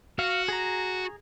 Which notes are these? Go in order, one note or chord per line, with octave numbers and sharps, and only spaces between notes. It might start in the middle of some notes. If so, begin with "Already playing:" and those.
F#4 F5
G#4 A#5